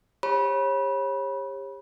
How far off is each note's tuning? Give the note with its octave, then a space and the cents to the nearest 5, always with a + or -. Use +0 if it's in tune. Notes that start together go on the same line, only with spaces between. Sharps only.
G4 +30 C#5 -35 B5 -25